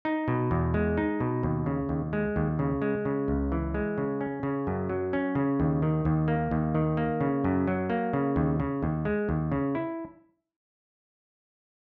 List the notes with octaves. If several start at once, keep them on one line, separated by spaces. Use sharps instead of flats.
D#4
B2
E2
G#3
D#4
B2
D#2
C#3
D#2
G#3
D#2
C#3
G#3
C#3
C#2
E3
G#3
C#3
C#4
C#3
F#2
F#3
C#4
C#3
D#2
D#3
D#2
A#3
D#2
D#3
A#3
C#3
F#2
F#3
A#3
C#3
D#2
C#3
D#2
G#3
D#2
C#3
E4